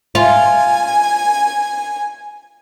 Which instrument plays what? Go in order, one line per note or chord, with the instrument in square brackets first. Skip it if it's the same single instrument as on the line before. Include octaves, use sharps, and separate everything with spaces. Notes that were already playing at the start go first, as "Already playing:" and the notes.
[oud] F4 [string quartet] G#5